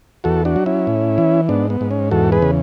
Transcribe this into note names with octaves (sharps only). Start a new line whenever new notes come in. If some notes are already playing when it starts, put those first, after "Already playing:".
E2 F#4 A4
D4 F#4
F#3
C#4 E4
A2
E3
G#2 B3 D4
B3
G#2
C#4
E2 F#4 A4
G#4 B4
C#3